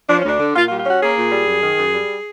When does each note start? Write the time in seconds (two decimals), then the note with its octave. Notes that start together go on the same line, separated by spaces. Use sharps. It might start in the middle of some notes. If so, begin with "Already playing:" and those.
0.08 F3 D4
0.19 C#4
0.25 D2 D4
0.40 D3
0.55 A#2 F4
0.67 F4
0.70 G3
0.78 F4
0.85 C#4 F#4
1.01 A#3 G#4
1.17 A#2
1.32 G3
1.48 F#2
1.63 D#3
1.78 F#2
1.94 G3